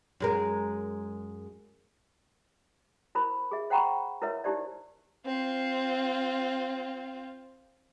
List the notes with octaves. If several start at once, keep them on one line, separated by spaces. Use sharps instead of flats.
F#2 G#3 A#4
E4 A#4 C5 B5
G#4 E5
C5 F#5 G5 A#5 B5 C#6
E4 A#4 B4 C#5 E5
D#4 E4 G4 C5 D5
C4 F4